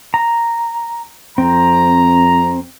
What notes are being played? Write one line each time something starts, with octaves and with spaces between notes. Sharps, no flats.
A#5
F2 C4 A#5